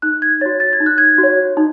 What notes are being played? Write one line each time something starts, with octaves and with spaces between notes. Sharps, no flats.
D#4 F#6
G#6
F#4 C#5 A6
A6
G#6
D#4
F#6
G#6
F#4
C#5
D#4